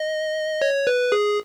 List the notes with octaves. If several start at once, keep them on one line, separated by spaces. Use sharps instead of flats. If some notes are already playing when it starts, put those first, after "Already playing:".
Already playing: D#5
C#5
B4
G#4